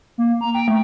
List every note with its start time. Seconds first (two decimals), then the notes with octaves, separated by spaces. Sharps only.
0.18 A#3
0.41 A#5
0.55 G5
0.68 A3